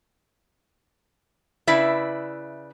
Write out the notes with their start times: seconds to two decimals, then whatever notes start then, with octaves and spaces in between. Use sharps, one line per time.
1.67 C#3 E4 B4 D5 E5